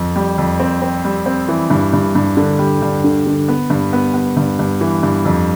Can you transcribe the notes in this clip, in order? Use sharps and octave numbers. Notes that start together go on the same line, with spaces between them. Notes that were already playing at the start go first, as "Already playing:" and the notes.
Already playing: F2
G3
F2
C4
C4
G3
C4
E3
G2
G2
G2
D3
G3
G2
D3
D3
B3
G2
B3
B3
G2
G2
E3
G2
F2